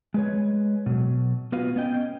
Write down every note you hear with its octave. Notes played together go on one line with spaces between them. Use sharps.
G#3 B4 C#5
B2 F#3
B3 F4 F#4 B4 F5
B3 C#4 D#5 G5